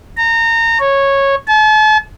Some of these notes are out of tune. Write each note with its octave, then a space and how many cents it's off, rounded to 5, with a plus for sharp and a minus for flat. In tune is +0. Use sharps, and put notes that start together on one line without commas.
A#5 -25
C#5 -10
A5 -40